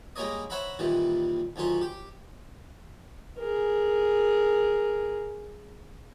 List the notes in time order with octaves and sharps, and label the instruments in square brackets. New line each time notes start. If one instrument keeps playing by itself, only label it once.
[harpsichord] G3 G#3 A#3 A#4 C#5 D#5
C5 C#5 E5 F#5 A#5 B5
A#2 D#3 E3 G3
D2 D#3 F#3 C#4 F4
G4
[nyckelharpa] G#4 A#4